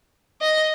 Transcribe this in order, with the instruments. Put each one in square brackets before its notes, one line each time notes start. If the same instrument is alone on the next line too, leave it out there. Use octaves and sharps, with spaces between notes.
[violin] D#5